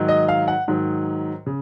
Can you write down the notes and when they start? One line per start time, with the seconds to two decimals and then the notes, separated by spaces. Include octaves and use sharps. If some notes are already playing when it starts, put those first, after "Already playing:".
Already playing: G#2 D#3 F#3
0.08 D#5
0.28 F5
0.48 F#5
0.68 G#2 D#3 F#3
1.46 C#3